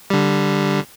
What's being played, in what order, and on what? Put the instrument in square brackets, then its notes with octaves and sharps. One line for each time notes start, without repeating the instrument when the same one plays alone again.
[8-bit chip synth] D3 G3